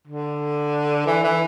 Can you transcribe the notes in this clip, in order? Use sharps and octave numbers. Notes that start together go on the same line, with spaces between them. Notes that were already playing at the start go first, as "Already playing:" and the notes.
D3
E3
E3